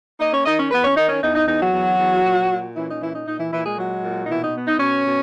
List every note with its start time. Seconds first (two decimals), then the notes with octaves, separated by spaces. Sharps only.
0.20 A#3 D#4 D#5
0.32 C#4 C#5
0.45 D#3 D#4 D#5
0.58 C#4 C#5
0.71 E2 B3 B4
0.83 C#4 C#5
0.96 D#3 D#4
1.09 C#4
1.22 E2 D#4
1.35 D#4
1.48 E2 D#4
1.61 F#3 F#4
1.73 E2
1.99 E2
2.24 A#2
2.50 A#2
2.76 E3 C#4 E4
2.88 D#4
3.01 A#2 E3 E4
3.13 D#4
3.27 A#2 D#4
3.39 E3 E4
3.52 A#2 E3 E4
3.65 G#3 G#4
3.78 F#3 G#3 F#4
4.03 A#2
4.25 D#4
4.29 B2 E3 E4
4.42 D#4
4.55 B3
4.67 D#4
4.80 B2 C#4 C#5
5.06 B2